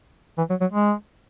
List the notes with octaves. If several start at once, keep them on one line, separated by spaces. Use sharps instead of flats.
E3
F#3
F#3
G#3